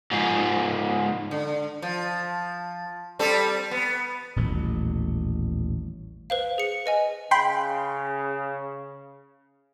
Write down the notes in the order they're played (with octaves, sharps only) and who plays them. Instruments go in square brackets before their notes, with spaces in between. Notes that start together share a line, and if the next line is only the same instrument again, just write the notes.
[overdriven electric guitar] G#2 F4
[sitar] D3
F3
G3 C4 A4
B3
[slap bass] D#1 A1 B2
[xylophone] B4 C5 F5
G#4 C#7
B4 D#5 G#5
[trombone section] C#3 [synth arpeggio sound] G5 B5 C6